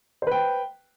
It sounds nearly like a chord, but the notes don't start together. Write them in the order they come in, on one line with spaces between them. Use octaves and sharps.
C5 B4 G5